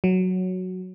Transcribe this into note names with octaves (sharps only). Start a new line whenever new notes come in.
F#3